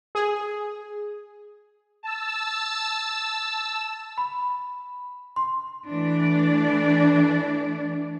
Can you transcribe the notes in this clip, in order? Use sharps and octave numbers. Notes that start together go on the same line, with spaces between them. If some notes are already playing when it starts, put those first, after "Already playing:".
G#4
A5 E6
B5
C6
E3 A3 D4 D5